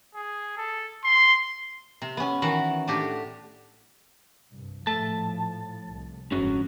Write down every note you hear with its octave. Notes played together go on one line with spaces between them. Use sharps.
G#4
A4
C6
C3
B3 C#4
D#3 E3 F#4 F#5
A2 D4 F#4 G4
C2 G2
A2 F3 A3 A5
C2
F#1 G#2 D3 F3 C#4 F#4